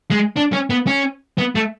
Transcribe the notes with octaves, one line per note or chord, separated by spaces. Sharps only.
G#3
D4
C#4
B3
C#4
B3
A3